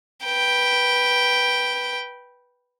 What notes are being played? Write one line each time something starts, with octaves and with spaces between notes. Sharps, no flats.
B4 G5